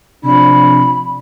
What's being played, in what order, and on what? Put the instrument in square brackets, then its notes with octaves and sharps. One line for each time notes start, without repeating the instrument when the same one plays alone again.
[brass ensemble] C3 F3 D4 [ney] B5